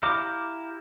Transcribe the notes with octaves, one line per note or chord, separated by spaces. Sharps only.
E4 G4 F5 A#5 D6